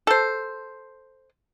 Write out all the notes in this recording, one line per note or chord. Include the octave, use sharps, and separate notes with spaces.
A4 C5